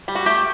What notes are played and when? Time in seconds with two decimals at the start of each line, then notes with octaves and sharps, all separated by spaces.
0.08 G3
0.15 F#4
0.26 A3 G4